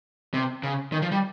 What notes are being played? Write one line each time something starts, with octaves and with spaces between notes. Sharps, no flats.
C3
C#3
D#3
F3
G3